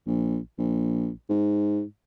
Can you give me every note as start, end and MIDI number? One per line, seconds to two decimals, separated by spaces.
0.07 0.38 34
0.58 1.11 34
1.29 1.83 44